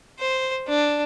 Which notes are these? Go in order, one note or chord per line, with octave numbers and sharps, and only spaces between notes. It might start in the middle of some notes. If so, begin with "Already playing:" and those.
C5
D4